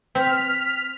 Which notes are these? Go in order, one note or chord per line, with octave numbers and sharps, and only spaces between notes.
C4 F6 B6